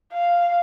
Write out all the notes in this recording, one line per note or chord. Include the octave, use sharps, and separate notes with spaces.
F5